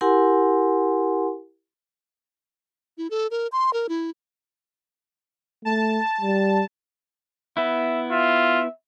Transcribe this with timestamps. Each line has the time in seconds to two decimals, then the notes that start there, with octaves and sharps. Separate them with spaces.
0.01 E4 G4 A#4 F#5 G#5 C6
2.98 E4
3.11 A4
3.31 A#4
3.52 C6
3.73 A#4
3.89 E4
5.65 A3 A5
6.21 G3
7.57 B3 E4 E5
8.11 F4 E5